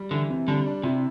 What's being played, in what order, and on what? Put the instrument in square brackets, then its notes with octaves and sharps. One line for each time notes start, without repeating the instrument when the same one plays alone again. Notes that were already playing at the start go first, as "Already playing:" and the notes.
Already playing: [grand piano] G3
[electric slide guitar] D3 [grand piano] E3
[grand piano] C3
[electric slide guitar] D3 [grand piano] G3
[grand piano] D4
[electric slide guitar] C3 [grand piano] E4